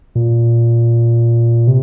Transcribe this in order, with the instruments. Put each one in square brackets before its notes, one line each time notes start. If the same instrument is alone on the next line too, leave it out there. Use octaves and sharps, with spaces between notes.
[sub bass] A#2
C3